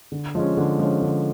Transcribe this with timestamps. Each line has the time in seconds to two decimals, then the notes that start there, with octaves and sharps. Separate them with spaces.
0.12 D3
0.35 F3 G#3 C#4
0.57 D3
0.79 F3 G#3 C#4
1.02 D3